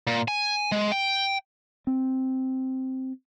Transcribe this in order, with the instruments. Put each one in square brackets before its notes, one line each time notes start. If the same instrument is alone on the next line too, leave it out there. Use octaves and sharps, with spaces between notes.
[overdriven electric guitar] A#2
G#5
G#3
G5
[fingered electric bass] C4